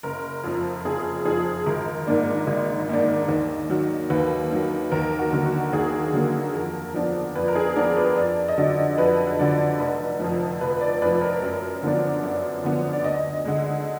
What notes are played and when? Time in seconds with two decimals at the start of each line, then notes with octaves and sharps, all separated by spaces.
0.03 F#1 A#4
0.44 F2 F3
0.85 F#1 G#4
1.26 F2 F3 G#4
1.66 G#1 A#4
2.07 G#2 D#3 A#3 D4
2.47 G#1
2.89 G#2 D#3 A#3 D4
3.29 D#2
3.70 D#3 F#3
4.10 D#2 B4
4.51 D#3 F#3
4.91 D#2 A#4
5.19 F#4
5.32 D3 F#3 A#3
5.46 F#4
5.73 D#2 G#4
6.13 D3 F#3 A#3
6.54 F2 A#4
6.94 F3 B3 D4
7.36 F2 B4
7.48 A#4
7.55 G#4
7.76 F3 B3 D4 A#4
7.97 B4
8.16 F2 D5
8.48 D#5
8.57 D3 F#3 D5
8.98 F2 B4
9.27 B4
9.39 D3 F#3 D5
9.80 F1
10.20 F2 F3
10.61 F1 B4
10.81 D5
11.02 F2 F3 B4
11.21 A#4
11.42 F#2
11.83 D3 F3 B3 D4
12.23 F#2
12.64 D3 F3 B3 D4
12.93 D5
13.04 D2 D#5
13.45 D3 G#3